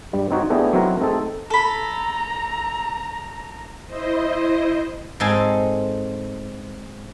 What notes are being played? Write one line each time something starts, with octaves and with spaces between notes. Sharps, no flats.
G2 G3
C4 D#4 F#4 C#5
A3 B3 D4 E4 G4 G#4
F#3 C4 D#4 E4 F#4 A#4
A3 C4 D#4 G#4 A4
A4 A#5 B5
E4 C5 D#5
G#2 C4 A4 D#5 G#5